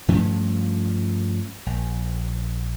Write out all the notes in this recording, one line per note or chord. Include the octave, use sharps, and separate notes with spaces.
G2 F3 A3 C#4
A#1